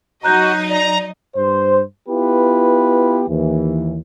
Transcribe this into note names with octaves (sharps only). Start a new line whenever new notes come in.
F#3 D#4 F#4 D#5 A#5 F#6 G6
D5 A#5
G2 C5
B3 E4 F4 G4 B4
D#2 E3